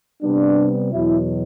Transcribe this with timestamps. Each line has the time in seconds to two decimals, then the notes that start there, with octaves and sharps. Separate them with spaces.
0.22 C3 G3 B3 D4
0.92 E2 B2 F#3 E4